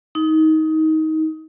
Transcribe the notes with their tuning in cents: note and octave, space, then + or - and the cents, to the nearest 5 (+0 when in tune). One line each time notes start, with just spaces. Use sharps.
D#4 +20